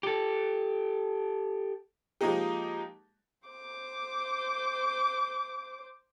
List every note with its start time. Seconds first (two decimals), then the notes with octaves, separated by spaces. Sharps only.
0.03 G4 A4
2.21 F3 G#3 A#3 D#4 G4
3.48 C5 D6